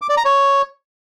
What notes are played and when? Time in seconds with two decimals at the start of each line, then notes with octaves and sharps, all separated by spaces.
0.02 D6
0.09 D5
0.17 A#5
0.25 C#5